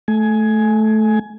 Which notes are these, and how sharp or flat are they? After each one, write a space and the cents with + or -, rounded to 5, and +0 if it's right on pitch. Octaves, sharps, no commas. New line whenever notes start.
A3 -15 G#5 +15